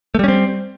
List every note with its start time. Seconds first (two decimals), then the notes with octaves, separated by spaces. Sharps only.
0.15 A3
0.19 G3
0.24 C#4
0.28 C4